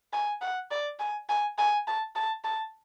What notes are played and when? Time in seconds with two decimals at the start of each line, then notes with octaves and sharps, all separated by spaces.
0.13 G#5
0.42 F#5
0.71 D5
0.99 G#5
1.29 G#5
1.58 G#5
1.87 A5
2.16 A5
2.44 A5